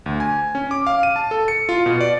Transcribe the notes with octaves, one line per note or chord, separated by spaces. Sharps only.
D2
G#5
C#4
D6
F5
D#7
A5
A4
C#7
F4
B2
D5